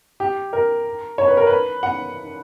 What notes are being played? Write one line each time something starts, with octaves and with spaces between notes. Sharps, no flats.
G4
A#4
C#5
B4
A#4
B4
F#5